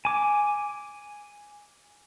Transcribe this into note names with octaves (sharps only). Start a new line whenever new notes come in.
G#5 D6